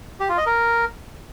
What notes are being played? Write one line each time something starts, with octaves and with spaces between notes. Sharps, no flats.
G4
F4
D#5
A#4